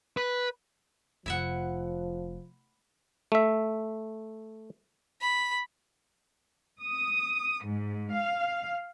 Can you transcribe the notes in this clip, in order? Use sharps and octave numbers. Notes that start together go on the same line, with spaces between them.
B4
F1 F3 E4 E5 F#5
A3 E5
B5
D#6
G#2
F5